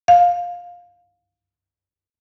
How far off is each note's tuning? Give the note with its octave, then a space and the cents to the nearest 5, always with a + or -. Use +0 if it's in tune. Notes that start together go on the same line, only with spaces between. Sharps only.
F5 +15